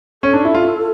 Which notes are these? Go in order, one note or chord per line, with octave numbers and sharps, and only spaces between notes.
C#4 A4
D4
E4
F4